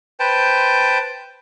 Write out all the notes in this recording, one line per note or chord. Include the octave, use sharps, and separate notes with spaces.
B4 C5 G5 A5